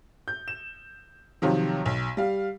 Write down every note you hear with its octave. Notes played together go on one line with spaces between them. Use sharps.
G6
E7
C3 D#3 F3 F#3
B1
G3 F5